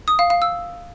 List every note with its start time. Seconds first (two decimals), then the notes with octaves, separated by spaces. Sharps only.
0.08 D#6
0.19 F5
0.30 F5
0.42 E6